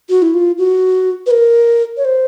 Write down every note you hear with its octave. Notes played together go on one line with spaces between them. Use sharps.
F#4
E4
F4
F#4
B4
A#4
C#5
C5